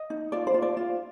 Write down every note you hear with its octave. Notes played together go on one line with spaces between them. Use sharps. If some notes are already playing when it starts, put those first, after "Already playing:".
Already playing: D#5
D#4
F4 D5
C5
F4
D5
F4